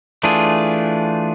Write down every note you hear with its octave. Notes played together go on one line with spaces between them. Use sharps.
E3 A3 D4 F4 G#4